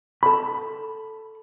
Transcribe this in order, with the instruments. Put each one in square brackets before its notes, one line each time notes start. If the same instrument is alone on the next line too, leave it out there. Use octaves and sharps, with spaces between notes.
[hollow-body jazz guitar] A4 B5